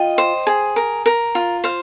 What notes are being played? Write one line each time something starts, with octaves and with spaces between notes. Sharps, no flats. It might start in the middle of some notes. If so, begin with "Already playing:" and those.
Already playing: F4 D#5 G5
C5
G#4
A#4
A#4
F4
C5 F5